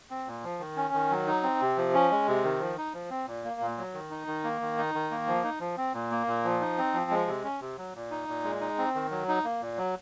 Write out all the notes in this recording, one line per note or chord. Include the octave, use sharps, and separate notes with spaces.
C4
A#2
F3
D#3
C#4
D#3
F#3
D#4
C4
C3
F3
C#4
G#3
C3
D#3
F3
D#4
F3
C4
A#2
A#3
A#2
F#3
D#3
D#4
D#3
A#3
D#3
D#4
D#3
A#3
F3
D#4
F3
C4
A#2
A#3
A#2
F3
D#4
C4
F3
G#3
C3
C#4
C3
F#3
A#2
D#4
A#2
G#3
D#4
C4
D#3
F#3
D#4
A#3
A#2
F#3